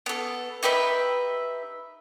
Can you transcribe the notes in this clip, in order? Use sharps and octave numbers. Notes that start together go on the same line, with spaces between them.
B3 A4
D#4 G4 B4 E5